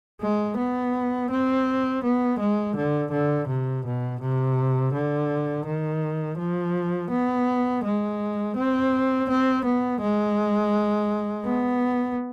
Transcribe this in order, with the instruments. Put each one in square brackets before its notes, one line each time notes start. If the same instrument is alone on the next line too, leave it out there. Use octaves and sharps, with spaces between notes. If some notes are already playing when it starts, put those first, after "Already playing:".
[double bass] G#3
B3
C4
B3
G#3
D3
D3
C3
B2
C3
D3
D#3
F3
B3
G#3
C4
C4
B3
G#3
B3